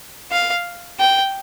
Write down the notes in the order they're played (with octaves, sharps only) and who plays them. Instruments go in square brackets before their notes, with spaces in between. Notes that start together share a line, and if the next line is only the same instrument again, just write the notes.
[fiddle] F5
G5